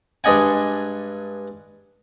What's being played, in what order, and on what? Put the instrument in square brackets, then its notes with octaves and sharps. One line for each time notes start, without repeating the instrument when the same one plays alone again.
[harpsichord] G2 G#3 D4 D#5 F#5 G#5